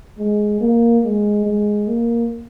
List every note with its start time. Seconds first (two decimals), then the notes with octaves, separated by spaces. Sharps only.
0.18 G#3
0.61 A#3
1.04 G#3
1.46 G#3
1.87 A#3